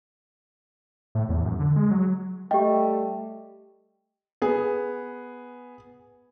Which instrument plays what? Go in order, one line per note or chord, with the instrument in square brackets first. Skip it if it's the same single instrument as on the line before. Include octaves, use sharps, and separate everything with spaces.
[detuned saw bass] A2
E2
F#2
D3
G#3
F#3
[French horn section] G3 A3 [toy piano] G4 D#5 [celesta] G5
[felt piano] B3 G#4